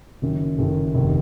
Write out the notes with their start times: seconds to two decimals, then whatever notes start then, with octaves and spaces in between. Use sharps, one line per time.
0.22 F#1 F#2 D#3
0.59 F#1 F#2 D#3 A4
0.95 F1 D#2 D#3